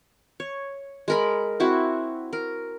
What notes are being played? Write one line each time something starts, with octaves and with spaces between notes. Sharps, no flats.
C#5
G#3 A#4 B5
C4 E4 F#4
A#4